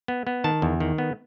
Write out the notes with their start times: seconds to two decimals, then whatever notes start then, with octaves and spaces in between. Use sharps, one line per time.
0.08 B3
0.27 B3
0.44 D#3 A5
0.62 E2
0.80 D#3
0.98 B3